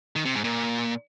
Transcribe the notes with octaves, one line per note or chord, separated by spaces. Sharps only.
D#3
C3
G#2
A#2